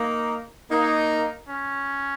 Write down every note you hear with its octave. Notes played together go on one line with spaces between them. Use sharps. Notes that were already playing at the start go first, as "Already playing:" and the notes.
Already playing: A#3 D#4
A#3 D#4
C#4